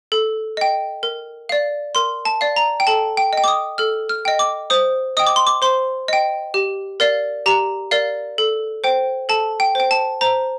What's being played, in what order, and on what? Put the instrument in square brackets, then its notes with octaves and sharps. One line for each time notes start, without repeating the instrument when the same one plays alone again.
[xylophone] A4
D#5 G5
A#4
D5 F5
A#4 C6
A5
D5 F5
A#5
G5
A4 A5
G5
D#5 G5
D6
D#6
A4 F6
F6
D#5 G5
D6
C5 D#6
D#5 G5 D#6
D6
C6
D6
C5 C6
D#5 G5
G4
A#4 D5 F5
G4 A#5
A#4 D5 F5
A4
C5 G5
A4 A5
G5
C5 G5
A5
C5 A#5